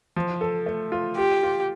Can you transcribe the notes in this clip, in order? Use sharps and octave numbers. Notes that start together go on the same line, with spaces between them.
F3
A4
A3
F4
F4 G4
F4